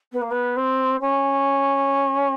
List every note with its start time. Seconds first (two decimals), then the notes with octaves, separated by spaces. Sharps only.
0.12 B3
0.22 A#3
0.31 B3
0.57 C4
1.01 C#4